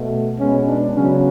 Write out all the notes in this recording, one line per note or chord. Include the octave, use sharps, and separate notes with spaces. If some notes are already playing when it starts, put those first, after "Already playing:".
Already playing: B2 A3
B2 G#3 B3 C#4
D4
C#3 F#3 B3 C#4